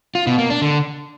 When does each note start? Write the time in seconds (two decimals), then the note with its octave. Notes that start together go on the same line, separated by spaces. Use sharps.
0.15 F4
0.27 B2
0.38 A#3
0.50 D4
0.62 D3